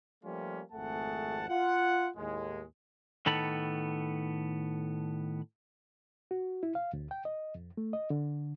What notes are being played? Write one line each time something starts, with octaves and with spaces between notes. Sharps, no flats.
F3 G3 A3 A#3 C#4 F4
G#1 F2 A3 G#4 F#5 A5
F4 F#5
D#2 A2 G#3
A2 D#3 B3 A4 B5
F#4
E4
F5
D2
G5
D#5
F2
A3
D#5
D3